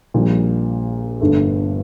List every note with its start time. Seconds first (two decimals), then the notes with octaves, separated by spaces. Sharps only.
0.14 A#1 A#2 G3
1.20 G1 G2 D3 A3